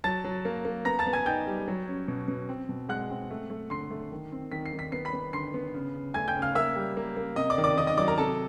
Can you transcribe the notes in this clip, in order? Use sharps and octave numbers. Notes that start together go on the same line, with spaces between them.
F#3 A5 A6
F#3
A#3
A#3
B3 A#5 A#6
A5 A6
B3
G#5 G#6
D#4 G5 G6
G3
F#3
C#4
B2
B2
C4
B2
G#3 F#5 F#6
C4
A3
A3
D3 C6 C7
A3
D#3
C4
D#3 B6
C7
D#3
B6
B3 C7
B5 B6
B3
D3 C6 C7
B3
C#3
C#3
A3 G#5 G#6
G5 G6
C#3
F5 F6
A#3 E5 E6
G3
A#3
A#3
C3 D#5 D#6
D5 D6
D#3
D5 D6
D#3 D#5 D#6
D#5 D#6
F#3 D5 D6
A#4 A#5
C3 A4 A5